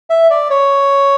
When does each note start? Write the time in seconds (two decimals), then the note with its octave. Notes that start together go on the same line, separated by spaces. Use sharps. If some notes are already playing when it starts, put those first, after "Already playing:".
0.10 E5
0.30 D5
0.50 C#5